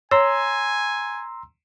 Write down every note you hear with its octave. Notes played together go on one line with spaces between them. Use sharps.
C#5 G#5 A#5 C6 E6